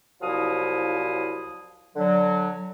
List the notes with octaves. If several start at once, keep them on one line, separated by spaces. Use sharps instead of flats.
C2 F3 F#3 E4 F5 D#6
D3 F#3